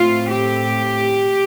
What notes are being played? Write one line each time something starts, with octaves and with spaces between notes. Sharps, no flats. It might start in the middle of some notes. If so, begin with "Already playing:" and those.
Already playing: A2 A3 C4 F4
G4